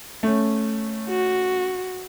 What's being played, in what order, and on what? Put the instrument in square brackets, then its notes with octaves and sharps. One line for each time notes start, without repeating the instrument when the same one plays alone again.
[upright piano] A3 C#4
[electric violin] F#4